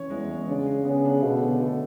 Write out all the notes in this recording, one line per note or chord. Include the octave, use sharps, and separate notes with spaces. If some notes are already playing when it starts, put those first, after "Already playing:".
Already playing: E3 C#4 C#5
E2 G#3
G#3
C#3 D4
G#4
C#3 B3
D4
B2 A3
D3
A3